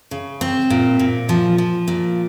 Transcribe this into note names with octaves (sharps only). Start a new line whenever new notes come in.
C#3
C4
A#2
A#2
F3
F3
A#2